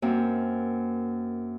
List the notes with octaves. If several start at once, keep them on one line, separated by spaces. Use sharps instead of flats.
F#2 A#3 C4